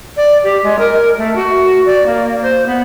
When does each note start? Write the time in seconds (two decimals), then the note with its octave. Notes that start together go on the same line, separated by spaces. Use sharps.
0.16 D5
0.43 G4
0.63 G#3
0.78 A#4
1.17 A3
1.35 F#4
1.85 D5
2.06 A#3
2.42 C5
2.66 B3